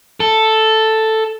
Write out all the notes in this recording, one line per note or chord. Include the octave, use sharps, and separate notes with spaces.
A4